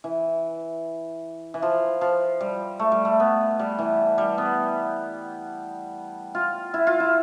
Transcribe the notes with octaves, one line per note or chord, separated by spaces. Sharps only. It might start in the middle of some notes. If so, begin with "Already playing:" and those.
E3
E3
F3
F3
G3
A3
G3
A3
B3
G3
E3
G3
B3
F4
E4
F4
E4